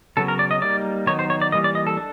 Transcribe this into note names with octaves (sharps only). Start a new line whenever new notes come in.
C#3 F#3 B3 A4
A#4
D5
D#5
G3 A#3 D#4 D5
D#3 F#3 B3 D#4 C#5
C5
C#5
D5
E3 G3 A#3 D#5
D5
D#5
A4
D4